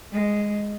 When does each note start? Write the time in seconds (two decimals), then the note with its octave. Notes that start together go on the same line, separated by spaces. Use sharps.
0.13 G#3